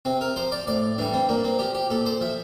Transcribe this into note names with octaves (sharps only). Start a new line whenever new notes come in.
C3 C4
A#4
F3 C5
D5
A2 D5
E3 G3 D4
C4
A#2 A#3
C4
F3 G4
G4
A#2 A4
C5
F3 E5